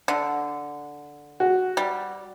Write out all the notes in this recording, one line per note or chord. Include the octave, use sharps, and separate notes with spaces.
D3
F#4
G3